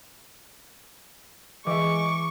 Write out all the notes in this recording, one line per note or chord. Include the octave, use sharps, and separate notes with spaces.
E3 G#3 E5 C#6 D6